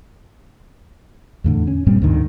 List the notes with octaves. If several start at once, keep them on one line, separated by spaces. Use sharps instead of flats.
E2 A2 D3
C#4
G2 A#2 G3 C4
D2 G#2 D3 D#3